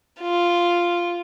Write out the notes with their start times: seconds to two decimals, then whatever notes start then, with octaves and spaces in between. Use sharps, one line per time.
0.21 F4